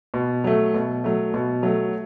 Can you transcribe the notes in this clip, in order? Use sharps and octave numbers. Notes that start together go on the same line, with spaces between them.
B2
F#3 A3
B2
F#3 A3
B2
F#3 A3